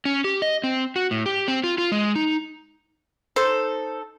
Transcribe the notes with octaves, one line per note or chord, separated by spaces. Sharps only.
C#4
G4
D#5
C4
F#4
A2
G4
C4
F4
F4
G#3
D#4
D#4 A4 C5